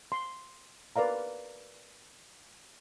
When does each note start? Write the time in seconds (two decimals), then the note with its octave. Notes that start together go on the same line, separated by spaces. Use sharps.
0.12 C6
0.96 A#4 B4 D5 F5 A#5